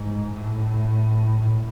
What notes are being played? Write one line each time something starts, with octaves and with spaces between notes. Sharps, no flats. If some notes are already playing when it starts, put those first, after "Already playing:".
Already playing: G#2
A2
A2